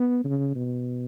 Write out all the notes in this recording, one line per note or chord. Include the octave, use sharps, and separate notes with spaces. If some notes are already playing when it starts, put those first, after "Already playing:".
Already playing: B3
C#3
B2